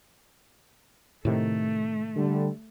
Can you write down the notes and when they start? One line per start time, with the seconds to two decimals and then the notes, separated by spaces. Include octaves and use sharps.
1.25 A2 C3 D#3 A3
2.17 D3 G3